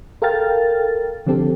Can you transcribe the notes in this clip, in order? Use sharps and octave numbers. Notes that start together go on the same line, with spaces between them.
A4 A#4 F5 G5 F6 A6
D3 F3 C4 G4 A4